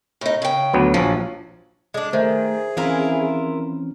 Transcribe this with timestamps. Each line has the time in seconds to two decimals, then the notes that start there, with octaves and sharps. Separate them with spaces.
0.21 A2 D#4
0.42 C#3 G5
0.73 D2 F#3 B3
0.94 A#1 F3 F#3
1.94 G#3 D4 D5
2.13 D#3 A3 G#4 C5 E5
2.77 E3 C4 C#4 E4 F4 A#4